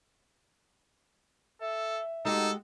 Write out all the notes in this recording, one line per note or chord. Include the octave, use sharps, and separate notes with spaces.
A4 E5
G#3 D#4 F#4 G4 A4